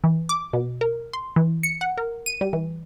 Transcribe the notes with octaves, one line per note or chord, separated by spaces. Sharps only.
E3
D6
B2
A#4
C6
E3
C#7
F#5
A#4
D#7
G3
E3